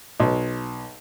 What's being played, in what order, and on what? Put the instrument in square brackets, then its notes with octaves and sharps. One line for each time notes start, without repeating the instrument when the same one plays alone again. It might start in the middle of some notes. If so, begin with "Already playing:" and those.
[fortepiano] B1